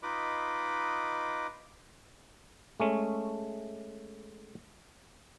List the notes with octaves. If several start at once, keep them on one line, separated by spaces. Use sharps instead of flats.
D#4 F4 B4 D#5 B5 D6
G#3 A3 C#4